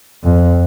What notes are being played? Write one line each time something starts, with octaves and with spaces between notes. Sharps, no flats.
F2